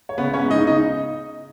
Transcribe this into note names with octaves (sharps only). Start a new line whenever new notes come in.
C#5
C#3 B3 B4
C#4 C#5
G#3
D#4 D#5
C#3 D#4 D#5